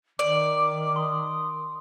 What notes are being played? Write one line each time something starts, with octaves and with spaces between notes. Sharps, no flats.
D#3 D5 D6
C6 D#6